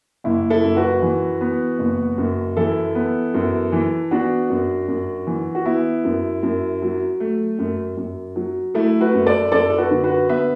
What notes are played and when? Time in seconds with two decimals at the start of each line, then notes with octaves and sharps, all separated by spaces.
0.24 F#1 E4
0.50 E4 A4
0.64 F#2
0.76 F#4 B4
1.02 E3
1.41 B3
1.79 F#1
2.18 F#2
2.56 E3 E4 A4
2.95 B3
3.34 F#2
3.72 E3
4.11 B3 D4 F#4
4.50 F#2
4.88 F#2
5.27 E3
5.55 F#4
5.66 B3 E4
6.04 F#2
6.43 F#2
6.82 F#3
7.20 A3
7.59 F#2
7.97 F#2
8.36 F#3
8.74 A3 E4 A4
9.01 F#4 B4
9.14 F#2
9.26 A4 D5
9.52 F#2 A4 D5
9.70 A4
9.78 F#4 B4
9.91 D3
10.04 F#4 B4
10.29 B3 B4 E5